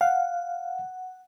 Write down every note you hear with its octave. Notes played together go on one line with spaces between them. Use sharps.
F5 F#5